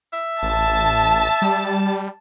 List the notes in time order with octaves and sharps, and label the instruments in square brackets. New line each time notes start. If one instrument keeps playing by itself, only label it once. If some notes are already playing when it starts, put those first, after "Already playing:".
[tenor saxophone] E5
[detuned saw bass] A1 [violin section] A5
[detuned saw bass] G3